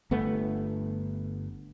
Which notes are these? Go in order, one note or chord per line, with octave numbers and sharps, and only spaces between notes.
G1 A3 B3